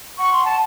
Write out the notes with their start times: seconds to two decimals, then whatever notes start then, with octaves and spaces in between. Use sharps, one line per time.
0.18 F#5 C#6
0.31 C6
0.44 A5